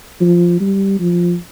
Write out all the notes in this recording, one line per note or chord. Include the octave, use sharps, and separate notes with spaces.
F3
G3
F3